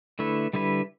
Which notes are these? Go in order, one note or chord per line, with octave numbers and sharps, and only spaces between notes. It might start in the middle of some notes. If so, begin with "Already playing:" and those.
D3 A3 E4 B4
D3 G3 E4 B4